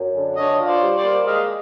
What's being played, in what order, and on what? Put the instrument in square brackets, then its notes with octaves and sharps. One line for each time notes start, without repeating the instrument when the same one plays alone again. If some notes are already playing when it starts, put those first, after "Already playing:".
Already playing: [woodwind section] F#2
D3
[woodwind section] D4 [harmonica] C#5 D#5
[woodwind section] F4
[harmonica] C5 D5
[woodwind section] G3
[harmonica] C5 D5
[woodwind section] A#3
[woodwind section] G#3 [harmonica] D#5 F5